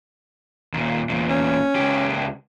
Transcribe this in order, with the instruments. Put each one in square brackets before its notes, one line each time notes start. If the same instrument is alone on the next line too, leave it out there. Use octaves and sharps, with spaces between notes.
[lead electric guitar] D#2 A#2
E2 A#2
[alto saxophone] C#4
[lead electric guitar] C#2 G4